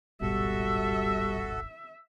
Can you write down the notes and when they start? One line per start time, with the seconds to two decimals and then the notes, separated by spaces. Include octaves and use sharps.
0.21 D1 G#1 B2 G3 F#4 A4 E5